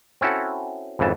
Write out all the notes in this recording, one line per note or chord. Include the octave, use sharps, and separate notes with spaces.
C4 C#4 E4 F#4 A4
G#1 F2 C#3 E3 A5